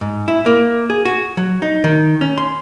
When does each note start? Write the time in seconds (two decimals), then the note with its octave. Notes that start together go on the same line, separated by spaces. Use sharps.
0.01 G#2
0.28 E4
0.46 A#3
0.90 G#4
1.05 F#4
1.37 F#3
1.62 D#4
1.84 D#3
2.21 C#4
2.38 C6